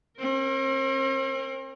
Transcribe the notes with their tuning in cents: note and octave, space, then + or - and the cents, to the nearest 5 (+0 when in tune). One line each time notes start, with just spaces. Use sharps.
C4 +45 A#4 +0